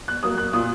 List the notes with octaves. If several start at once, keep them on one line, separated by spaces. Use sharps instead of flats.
F#6
F#3 A#3 D#6
F#6
A#2 D#6